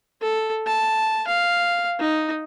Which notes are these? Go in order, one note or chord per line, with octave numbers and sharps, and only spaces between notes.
A4
A5
F5
D#4